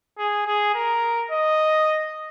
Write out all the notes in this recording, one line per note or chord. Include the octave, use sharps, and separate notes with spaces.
G#4
G#4
A#4
D#5